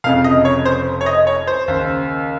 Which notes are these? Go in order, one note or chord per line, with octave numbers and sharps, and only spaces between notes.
F1 F2 C#3 F5
D#5
C#5
C5
C#5
D#5
C#5
C5
D#2 C#3